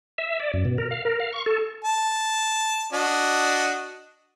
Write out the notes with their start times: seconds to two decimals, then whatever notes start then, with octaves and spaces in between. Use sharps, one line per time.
0.18 E5
0.40 D5
0.54 F#2
0.65 B2
0.78 A#4
0.91 F5
1.05 A#4
1.20 F5
1.32 C#6
1.46 A4
1.84 A5
2.93 D4 F#4 D#5